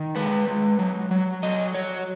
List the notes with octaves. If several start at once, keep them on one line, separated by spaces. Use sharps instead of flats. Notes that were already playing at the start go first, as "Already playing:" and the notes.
Already playing: D#3
G#3 B4
G#3
F#3
F#3
F#3 D#5
F#3 C#5